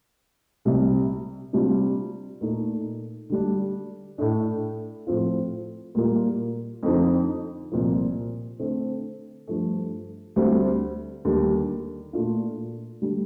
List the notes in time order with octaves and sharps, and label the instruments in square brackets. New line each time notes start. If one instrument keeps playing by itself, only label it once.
[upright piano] C2 C3 G3
C3 G3 D4 F4
A#2 A3 D#4
D3 G3 D4
A2 A3 D4
A2 F3 C4 F4
A#2 G3 A#3 F4
F2 D3 F3 C4 D#4
C2 A#2 F3
D3 A3 C4
G2 F3 A3
D2 D3 G3 C4
D#2 D3 G3
A#2 A3 D4 F4
D3 G3